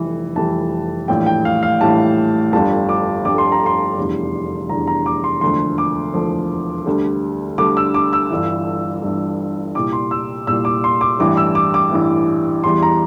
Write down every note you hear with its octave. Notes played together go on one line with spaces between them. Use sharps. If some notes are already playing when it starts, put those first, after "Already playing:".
Already playing: F1 F2 E3 G3
F1 F2 E3 G3 A5
A#1 A2 E3 G3 G5
G5
F5
F5
A#1 A2 E3 G3 A5
G1 F2 D3 G3 A5
D6
G1 F2 D3 G3 D6
C6
A#5
C6
F1 E2 D3 G3
F1 E2 D3 G3 A#5
A#5
D6
C6
E1 D2 D3 F3 C6
D6
E1 D2 D3 F3
D2 D3 G3
D2 D3 G3 D6
E6
D6
E6
G1 G2 E3
G1 G2 E3
C2 A#2 G3 D6
C6
E6
C2 A#2 G3 E6
D6
C6
D6
A1 G2 E3 G3 D6
E6
D6
D6
A1 G2 E3 G3
E2 E3 G3 C6
A#5